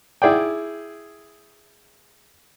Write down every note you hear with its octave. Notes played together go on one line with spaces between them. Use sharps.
E4 G#4 D5 G5